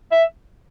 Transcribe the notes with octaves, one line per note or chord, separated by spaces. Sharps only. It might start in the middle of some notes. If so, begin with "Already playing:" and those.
E5